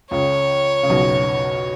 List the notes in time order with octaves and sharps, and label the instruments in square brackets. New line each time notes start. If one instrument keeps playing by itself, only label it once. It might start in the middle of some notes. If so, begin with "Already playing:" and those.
[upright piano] C#2 C#3 [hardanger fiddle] C#5
[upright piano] C#3
B1 B2